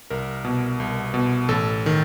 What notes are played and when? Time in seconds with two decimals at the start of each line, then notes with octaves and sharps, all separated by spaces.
0.10 C2 A#4
0.44 B2
0.80 C2
1.14 B2
1.49 A1 A4
1.86 D#3